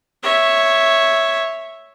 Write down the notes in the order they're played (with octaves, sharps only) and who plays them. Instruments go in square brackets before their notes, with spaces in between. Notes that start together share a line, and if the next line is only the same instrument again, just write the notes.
[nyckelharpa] C#5 E5